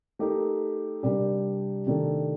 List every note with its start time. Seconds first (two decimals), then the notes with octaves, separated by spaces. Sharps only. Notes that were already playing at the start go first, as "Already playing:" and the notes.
0.19 A3 D#4 G4 A#4
1.03 C3 G3 D4 G4 A#4
1.87 C3 D#3 A3 D4